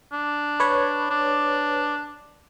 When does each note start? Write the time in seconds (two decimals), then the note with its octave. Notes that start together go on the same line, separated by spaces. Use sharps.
0.12 D4
0.60 B4 C#5
1.10 D4